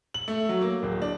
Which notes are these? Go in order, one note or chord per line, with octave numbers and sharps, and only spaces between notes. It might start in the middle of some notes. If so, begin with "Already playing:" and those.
F#7
A3
F#3
A#3
D1
D4